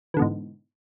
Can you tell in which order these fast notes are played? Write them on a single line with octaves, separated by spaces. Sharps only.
E3 D3 B2 G#2